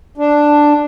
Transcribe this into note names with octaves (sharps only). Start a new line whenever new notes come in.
D4